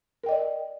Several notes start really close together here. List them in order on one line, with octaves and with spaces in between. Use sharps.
A#4 G5 D#5 D5